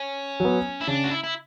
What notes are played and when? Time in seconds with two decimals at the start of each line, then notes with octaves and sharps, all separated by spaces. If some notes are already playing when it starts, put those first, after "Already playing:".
Already playing: C#4
0.40 F#3 B3
0.81 E4
0.87 C#3 D4
1.04 F#4
1.11 E4
1.24 E4